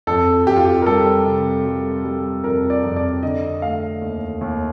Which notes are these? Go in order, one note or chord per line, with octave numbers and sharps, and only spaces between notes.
F2 A4
F2 G4
F4
G4
A#4
G3 A4
C3
G3
G3
F2 A#4
D5
F2
D5
D3 D#5
A3 F5
D#2
D#2